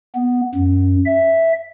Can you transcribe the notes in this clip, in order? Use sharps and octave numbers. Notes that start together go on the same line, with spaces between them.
B3
F#2
E5